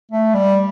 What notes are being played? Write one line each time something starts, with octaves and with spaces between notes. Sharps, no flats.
A3
G3